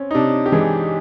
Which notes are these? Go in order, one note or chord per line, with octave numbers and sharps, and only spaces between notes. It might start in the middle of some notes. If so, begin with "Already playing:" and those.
Already playing: C4 C#4
D#4
C3 D4
G4
E3 G#3 G#4